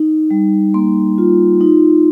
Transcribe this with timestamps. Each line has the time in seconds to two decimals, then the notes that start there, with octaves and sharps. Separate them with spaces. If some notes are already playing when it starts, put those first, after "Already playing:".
Already playing: D#4
0.31 G3
0.74 A#3 C6
1.18 F4
1.61 D#4